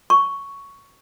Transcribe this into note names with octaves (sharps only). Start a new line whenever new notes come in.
C#6